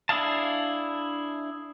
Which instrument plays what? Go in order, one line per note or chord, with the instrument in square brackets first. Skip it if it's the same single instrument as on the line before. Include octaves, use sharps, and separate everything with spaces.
[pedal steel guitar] D4 E4 G#4 F5 A5